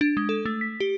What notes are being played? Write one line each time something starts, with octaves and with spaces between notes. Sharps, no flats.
D4
G#3
A4
A3
B6
G4